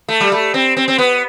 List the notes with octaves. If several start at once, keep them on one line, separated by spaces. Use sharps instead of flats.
A3
G3
A3
C4
C4
C4
B3